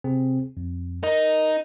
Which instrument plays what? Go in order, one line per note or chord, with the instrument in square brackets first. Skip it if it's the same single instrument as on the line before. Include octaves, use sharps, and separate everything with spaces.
[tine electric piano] C3 C4 G#4
F2
[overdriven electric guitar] D#4 [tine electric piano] A#4